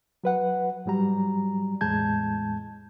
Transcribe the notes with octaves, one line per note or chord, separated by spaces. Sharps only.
F#3 B4 F#5
G#2 F#3 G3 A#5
E2 A2 G#3 A5 G6 G#6